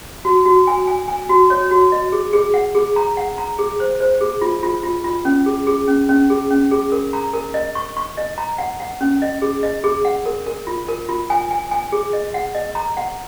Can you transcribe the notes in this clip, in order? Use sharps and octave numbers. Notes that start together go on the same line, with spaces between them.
F#4
F#4
G#5
G#5
G#5
F#4
C#5
F#4
D#5
G#4
G#4
F#5
G#4
A#5
F#5
A#5
G#4
C5
C5
G#4
F4
F4
F4
F4
C#4
G#4
G#4
C#4
C#4
G#4
C#4
G#4
A#4
A#5
A#4
D#5
C#6
C#6
D#5
A#5
F#5
F#5
C#4
D#5
G#4
D#5
G#4
F#5
A#4
A#4
F4
A#4
F4
G#5
G#5
G#5
G#4
D#5
F#5
D#5
A#5
F#5